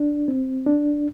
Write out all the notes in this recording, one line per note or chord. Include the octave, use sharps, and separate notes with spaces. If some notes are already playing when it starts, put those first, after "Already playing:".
Already playing: D4
C4
D4